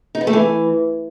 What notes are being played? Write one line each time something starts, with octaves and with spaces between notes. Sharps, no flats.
D#4
B3
A3
E3